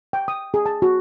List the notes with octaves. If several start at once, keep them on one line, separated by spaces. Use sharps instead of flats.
G5
D#6
G#4
A5
F#4